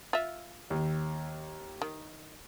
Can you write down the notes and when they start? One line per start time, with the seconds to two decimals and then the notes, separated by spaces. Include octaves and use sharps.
0.13 F4 E5
0.70 D#2
1.82 D#3